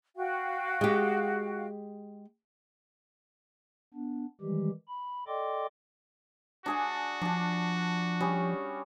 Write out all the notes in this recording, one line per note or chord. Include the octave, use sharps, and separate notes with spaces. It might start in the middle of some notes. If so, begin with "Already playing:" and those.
F#4 F5 G5
G#3 G4
B3 D4
D#3 E3 G3 G#3 G4
B5
A4 D5 D#5 G5 C6 D6
D4 F#4 G#4 G#5
F3 D4 A5
G3 C#4 G#4